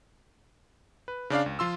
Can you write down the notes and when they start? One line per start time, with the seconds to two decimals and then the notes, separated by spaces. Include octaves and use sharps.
1.08 B4
1.30 C#3 D4 D5 F5
1.46 C#2
1.59 F3 F4 C6 E6